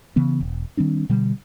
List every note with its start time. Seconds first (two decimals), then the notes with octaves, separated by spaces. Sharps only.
0.16 C#3 E3 B3
0.41 E1
0.77 D#3 G3 C4 D4
1.09 B2 D3 G3